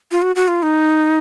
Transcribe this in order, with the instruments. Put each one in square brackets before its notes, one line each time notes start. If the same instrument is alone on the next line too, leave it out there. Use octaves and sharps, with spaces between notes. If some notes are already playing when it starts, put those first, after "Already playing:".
[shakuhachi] F4
F#4
F#4
F4
D#4